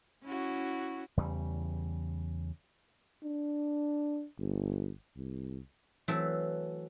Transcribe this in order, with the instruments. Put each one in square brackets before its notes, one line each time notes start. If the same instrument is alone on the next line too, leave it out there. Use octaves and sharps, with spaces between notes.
[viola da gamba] C#4 E4 F#4
[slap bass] E2 C#3 G3
[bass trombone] D4
G1
C2
[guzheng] E3 F#3 A3 C4 E5